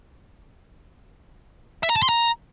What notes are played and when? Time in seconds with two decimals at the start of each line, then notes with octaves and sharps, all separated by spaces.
1.83 E5
1.89 A#5
1.96 A5
2.02 C6
2.09 A#5